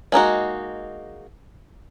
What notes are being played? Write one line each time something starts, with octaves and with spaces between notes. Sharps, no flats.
G#3 A#3 D#4 F#4